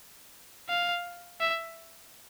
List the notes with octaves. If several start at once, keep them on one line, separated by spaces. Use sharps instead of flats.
F5
E5